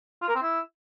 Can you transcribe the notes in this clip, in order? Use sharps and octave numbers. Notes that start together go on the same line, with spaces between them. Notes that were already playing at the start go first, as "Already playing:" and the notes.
F4
A#4
C4
E4